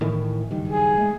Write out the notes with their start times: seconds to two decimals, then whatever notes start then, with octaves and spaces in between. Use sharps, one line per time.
0.01 A2 D#3 E3
0.50 F#1 G2 D#3
0.68 G#4
0.98 G#3 A3